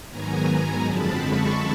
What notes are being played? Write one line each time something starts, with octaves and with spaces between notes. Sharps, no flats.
G#2 D#3 F#3 B3 G#5 A#5
F#2 D3 F3 G#3 C4 A5 B5
B5 C#6